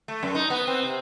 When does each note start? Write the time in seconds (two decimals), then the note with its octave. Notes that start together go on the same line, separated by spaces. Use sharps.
0.08 A3
0.23 F#2
0.35 D#4
0.50 B3
0.67 C4
0.83 C3